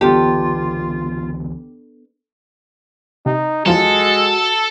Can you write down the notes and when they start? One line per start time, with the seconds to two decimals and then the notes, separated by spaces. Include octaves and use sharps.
0.01 C#2 D3 E3 B3 D4 F4 G4 A4
3.26 C3 D#4
3.66 E2 F3 F#3 G#3 F#4 A4